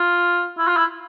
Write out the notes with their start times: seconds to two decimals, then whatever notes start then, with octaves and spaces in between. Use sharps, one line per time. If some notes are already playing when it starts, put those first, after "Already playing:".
Already playing: F4
0.58 E4
0.67 F4
0.77 E4